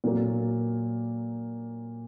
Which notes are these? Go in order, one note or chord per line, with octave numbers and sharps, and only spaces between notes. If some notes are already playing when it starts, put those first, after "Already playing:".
A#2 F#3 A#3